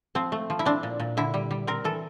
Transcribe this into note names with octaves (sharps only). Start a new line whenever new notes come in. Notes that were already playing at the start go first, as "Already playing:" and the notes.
F3 C4
A3
F3
E4
C4 D4
A#2
A#2
D3 E4
G3
G3
C4 A#4
E3 A4